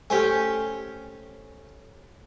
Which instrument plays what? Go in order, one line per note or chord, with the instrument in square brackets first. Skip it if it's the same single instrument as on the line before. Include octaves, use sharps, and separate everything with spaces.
[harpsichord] A3 C5 [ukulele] C#4 G4 G#5